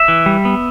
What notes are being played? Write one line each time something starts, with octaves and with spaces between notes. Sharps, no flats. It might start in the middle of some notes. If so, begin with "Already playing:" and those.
Already playing: E5
E3
G3
B3